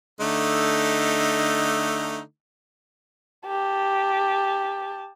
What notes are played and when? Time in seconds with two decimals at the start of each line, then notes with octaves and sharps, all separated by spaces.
0.21 D3 A3 D#4
3.47 G4 A5